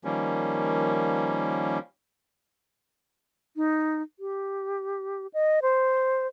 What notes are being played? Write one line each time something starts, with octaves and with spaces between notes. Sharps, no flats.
D#3 F3 G3 A#3 C#4
D#4
G4
D#5
C5